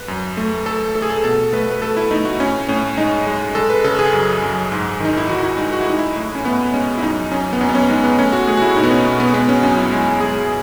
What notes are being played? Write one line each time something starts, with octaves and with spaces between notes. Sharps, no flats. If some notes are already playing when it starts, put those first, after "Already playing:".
Already playing: B4
F#2
A3
A3 A4
A3 A4
G#4
A4
B2 A4
A3 B4
B4
A3 A4
E4
A3 D#4
F#4
A2 C#4
A2 C#4
G#3 D#4
G#3
G#3 A4
B4
C#3 A4
G#4
F#2
F#2
G#2
D#3 D#4
E4
D#3 F#4
E4
G#3 D#4
F#4
E4
G#3 D#4
E4
A2
C#4
A2 B3
G#3 C#4
E4
F#2 D#4
F#2 C#4
B3
F#2 C#4
B3
C#4
G#3 D#4
B3
A3 C#4
F#4
A3 G#4
F#4
E4
B2 D#4
B3
C#4
B2
B3
G#3 B3
C#4
F#2 C#4
E4
G#3 E4
G#3 G#4